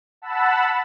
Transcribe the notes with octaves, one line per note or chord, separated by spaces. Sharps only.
F#5 A5 B5 E6